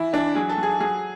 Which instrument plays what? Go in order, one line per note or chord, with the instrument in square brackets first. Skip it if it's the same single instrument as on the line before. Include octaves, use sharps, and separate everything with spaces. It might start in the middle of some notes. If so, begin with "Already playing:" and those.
Already playing: [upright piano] E3 E4
E3 D4
F#3 G#4
A4
F#3
G#4
F#3 G#4